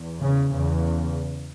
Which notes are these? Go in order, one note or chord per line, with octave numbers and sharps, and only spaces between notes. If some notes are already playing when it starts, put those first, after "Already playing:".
Already playing: E2
C#3
E2 C#3